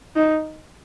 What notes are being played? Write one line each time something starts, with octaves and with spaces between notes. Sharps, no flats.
D#4